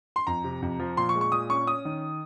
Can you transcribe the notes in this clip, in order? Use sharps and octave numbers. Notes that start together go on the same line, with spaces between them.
C6
F2 A#5
C3
F2
F3
A#2 C6
C#6
G#3
C#6
A#2 D#6
C#4 C#6
C#4 D#6
D#3